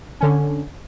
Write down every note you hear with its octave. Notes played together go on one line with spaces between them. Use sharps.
D3 C#4